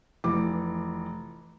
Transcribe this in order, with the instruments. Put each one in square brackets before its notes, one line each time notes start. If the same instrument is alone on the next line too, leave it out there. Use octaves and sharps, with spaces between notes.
[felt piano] F1 E3 D6